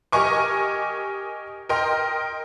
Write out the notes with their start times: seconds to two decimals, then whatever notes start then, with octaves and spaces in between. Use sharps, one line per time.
0.12 G4 A#4 D#5 G#5 C#6 D6
1.69 A#4 D#5 G5 C6